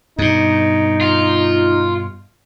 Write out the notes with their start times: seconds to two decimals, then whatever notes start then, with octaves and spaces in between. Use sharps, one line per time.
0.19 G2 B2 D#4
1.01 F4